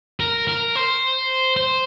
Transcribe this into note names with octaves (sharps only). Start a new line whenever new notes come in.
A#4
A#4
C5
C5